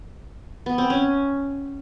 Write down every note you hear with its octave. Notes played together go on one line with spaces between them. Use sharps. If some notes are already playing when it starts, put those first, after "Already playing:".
B3
C4
C#4